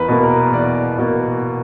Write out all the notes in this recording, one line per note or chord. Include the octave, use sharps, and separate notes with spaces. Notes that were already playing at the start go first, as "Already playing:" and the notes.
Already playing: E2 A#4 B4
B2 A#3
A#4
E2 D5
B2 A#3